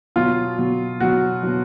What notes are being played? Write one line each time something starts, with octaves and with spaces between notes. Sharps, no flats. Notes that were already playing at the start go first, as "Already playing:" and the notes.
B2 F#3 F4
B2 F#3
B2 F#3 F#4
B2 F#3